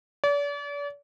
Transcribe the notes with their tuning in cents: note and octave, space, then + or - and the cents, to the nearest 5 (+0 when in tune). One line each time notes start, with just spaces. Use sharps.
D5 -40